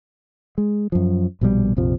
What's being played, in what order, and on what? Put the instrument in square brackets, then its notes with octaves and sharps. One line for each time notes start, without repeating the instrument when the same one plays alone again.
[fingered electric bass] G#3
F#2 F3
A#1 B2 E3 G3
A#1 F2 C3 F3